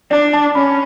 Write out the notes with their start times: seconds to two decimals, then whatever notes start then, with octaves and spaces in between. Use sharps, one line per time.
0.11 D4 D5
0.33 A5
0.55 C#4 B5